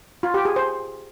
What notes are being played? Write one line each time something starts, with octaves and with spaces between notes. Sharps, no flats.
F4
G4
G#4
C5